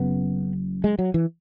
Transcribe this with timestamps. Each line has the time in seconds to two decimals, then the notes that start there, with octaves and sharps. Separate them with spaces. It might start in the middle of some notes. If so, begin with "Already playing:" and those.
Already playing: F#1 F#2 C#3 B3
0.84 G#3
0.99 F#3
1.14 E3